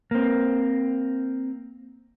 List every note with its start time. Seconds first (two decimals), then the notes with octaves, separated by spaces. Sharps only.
0.11 A#3 C4